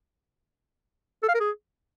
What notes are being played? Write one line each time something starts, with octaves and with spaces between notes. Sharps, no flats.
A4
F5
A#4
G#4